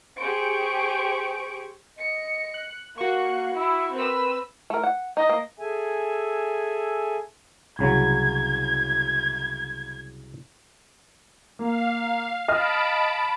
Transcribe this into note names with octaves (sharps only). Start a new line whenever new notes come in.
G4 G#4 C5 C#6 D7
D#5 C#7
F#6
A#3 F#4 F5 C#6 F#6
E4 E6
C4 A#4 B4 E6
A3 A#4
F#5
D#4 D#5
A#3
G#4 A4 E5 G#5
C2 C#3 F#3 G#6
A#3 F5
D#5 A5 B5 F6 D7